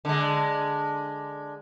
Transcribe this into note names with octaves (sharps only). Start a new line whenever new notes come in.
D3 G#3